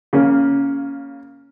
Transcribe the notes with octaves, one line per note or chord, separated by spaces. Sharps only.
C#3 A#3 C#4